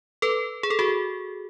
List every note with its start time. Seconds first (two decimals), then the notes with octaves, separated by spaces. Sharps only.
0.22 A4 B4
0.63 G#4
0.70 A4
0.79 F#4 G#4